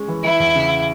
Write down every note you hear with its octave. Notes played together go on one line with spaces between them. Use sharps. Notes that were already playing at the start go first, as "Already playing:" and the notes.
Already playing: G#3 C#4
E3
E3 E4
E2
C#3